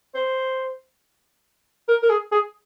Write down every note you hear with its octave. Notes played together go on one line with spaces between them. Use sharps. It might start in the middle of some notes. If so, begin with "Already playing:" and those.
C5
A#4
A#4
G#4
G#4